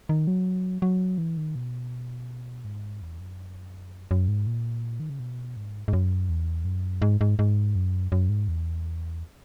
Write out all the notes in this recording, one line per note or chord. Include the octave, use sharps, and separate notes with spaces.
D#3
F#3
F#3
E3
D#3
B2
G#2
E2
F#2
F#2
G#2
A#2
D#3
C#3
B2
G#2
G#2
F#2
E2
F#2
G#2
G#2
G#2
F#2
F#2
G#2
E2